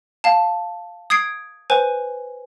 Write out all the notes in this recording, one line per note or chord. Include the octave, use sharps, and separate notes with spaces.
F5 A5
D#6 G#6 C7 D7
B4 C5 G#5